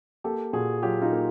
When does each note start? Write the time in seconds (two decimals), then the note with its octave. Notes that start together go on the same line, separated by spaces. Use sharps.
0.24 A#3 G4 A4
0.53 A#2 F#4 G#4
0.82 F#3 F4 G4
1.02 D#4 F4
1.12 A#3